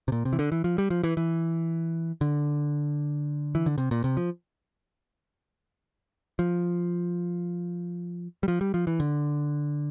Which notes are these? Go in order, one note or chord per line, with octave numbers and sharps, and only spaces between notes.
C3
A#2
C3
E3
D3
E3
F3
G3
F3
E3
E3
D3
E3
D3
C3
A#2
C3
F3
F3
G3
F3
G3
F3
E3
D3